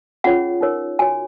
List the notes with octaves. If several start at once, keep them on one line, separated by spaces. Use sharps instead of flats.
C#4 F4 G#4 C#5 F#5
D#4 A#4 C#5
F#4 C#5 G#5